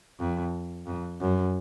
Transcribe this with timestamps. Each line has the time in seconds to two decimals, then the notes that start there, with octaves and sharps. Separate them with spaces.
0.20 F2
0.87 F2
1.21 F#2